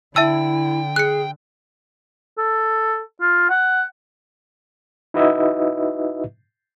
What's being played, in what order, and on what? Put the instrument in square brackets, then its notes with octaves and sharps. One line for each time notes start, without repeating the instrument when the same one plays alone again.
[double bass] D3 [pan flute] E4 [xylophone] E5 A5 E6 [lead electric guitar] G5
[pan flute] G#4 [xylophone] F#6 C#7
[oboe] A4
F4
F#5
[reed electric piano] D#4 E4 F#4 B4 D#5 E5